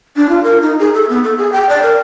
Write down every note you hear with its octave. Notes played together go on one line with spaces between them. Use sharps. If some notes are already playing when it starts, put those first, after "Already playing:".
D4
F4
A#4
D#4
G#4
A4
B3
A4
G#4
G5
D5
A#4